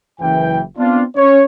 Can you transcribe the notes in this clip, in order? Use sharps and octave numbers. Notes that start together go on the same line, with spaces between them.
F#1 E3 G5
B3 C4 D4 F4
C#4 C#5